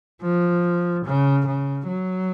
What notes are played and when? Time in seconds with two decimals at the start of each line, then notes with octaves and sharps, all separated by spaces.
0.22 F3
1.05 C#3
1.46 C#3
1.87 F#3